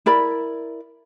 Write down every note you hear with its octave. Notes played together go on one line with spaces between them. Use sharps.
E4 A#4 D5 B5